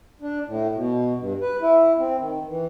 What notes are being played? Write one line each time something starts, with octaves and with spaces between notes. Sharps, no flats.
D4
A2
B2
G2
B4
E4
C4
D#3
E3